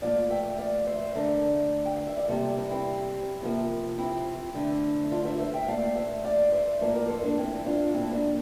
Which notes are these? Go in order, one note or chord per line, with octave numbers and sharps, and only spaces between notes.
A#2 F3 A3 D5 F5
E5 G5
D5 F5
C5 E5
D3 A3 A#4 D5
G5
F5
E5
D5
C3 G3 A#3 A4 C5
C4 E4
C4 E4
C3 F3 A#3
C4 E4
D3 A3
D4 F4
C5 E5
C5 E5
E5 G5
A#2 A3 D5 F5
C5 E5
D5 F5
C5 E5
A2 F3 A#3 A#4 D5
A#4 D5
A4 C5
A#3 D4
C4 E4
D4 F4
A#2 F3 A3 C4 E4
A#3 D4